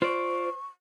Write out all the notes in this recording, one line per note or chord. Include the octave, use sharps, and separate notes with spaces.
F4 C5 D5 C#6